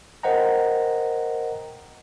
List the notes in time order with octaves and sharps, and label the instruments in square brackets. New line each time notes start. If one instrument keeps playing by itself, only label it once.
[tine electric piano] A#4 C5 D#5 F#5 G5 A#5